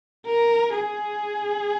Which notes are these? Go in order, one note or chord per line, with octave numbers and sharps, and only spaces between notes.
A#4
G#4